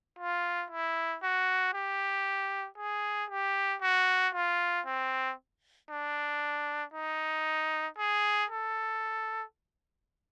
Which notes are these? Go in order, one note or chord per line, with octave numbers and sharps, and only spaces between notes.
F4
E4
F#4
G4
G#4
G4
F#4
F4
C4
D4
D#4
G#4
A4